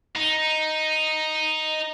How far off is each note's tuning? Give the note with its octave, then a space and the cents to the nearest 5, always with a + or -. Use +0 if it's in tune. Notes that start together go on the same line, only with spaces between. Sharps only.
D#4 +0